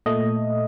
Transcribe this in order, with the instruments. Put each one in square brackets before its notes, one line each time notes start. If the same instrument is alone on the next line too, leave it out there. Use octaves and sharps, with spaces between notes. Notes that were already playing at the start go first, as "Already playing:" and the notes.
[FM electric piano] A#2 A3 D#5